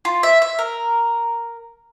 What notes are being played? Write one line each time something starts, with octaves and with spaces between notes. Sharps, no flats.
F4
E5
E5
A#4